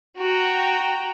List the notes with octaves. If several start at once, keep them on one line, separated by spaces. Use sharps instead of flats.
F#4 G5 A#5